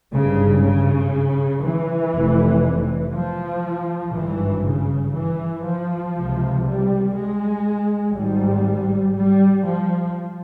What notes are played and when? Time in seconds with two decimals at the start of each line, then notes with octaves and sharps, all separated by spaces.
0.12 G#1 G2 C#3
0.63 C#3
1.63 E3
2.13 F1 F2 C3
3.13 F3
4.14 G#1 G2 E3
4.64 C#3
5.14 E3
5.64 F3
6.15 C#2 C3
6.65 G3
7.15 G#3
8.14 G#1 G#2 G3
9.15 G3
9.65 F3